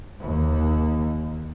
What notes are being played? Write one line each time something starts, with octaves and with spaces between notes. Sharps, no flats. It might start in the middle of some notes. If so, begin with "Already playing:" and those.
D#2